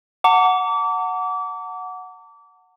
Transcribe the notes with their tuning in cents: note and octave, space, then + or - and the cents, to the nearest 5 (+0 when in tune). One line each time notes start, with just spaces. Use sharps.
F#5 -5 A5 +45 D6 -30